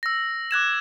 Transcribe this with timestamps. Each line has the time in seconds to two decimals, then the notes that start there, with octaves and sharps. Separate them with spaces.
0.03 E6 A#6
0.51 D6 F#6 G#6 E7